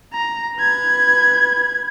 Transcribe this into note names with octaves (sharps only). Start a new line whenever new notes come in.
A#5
B4 G#6